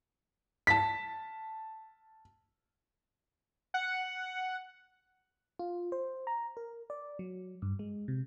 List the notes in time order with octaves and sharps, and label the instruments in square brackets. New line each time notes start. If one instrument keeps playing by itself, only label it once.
[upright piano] A5 B6
[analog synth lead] F#5
[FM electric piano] F4
C5
A#5
A#4
D5
F#3
G2
G#3
C3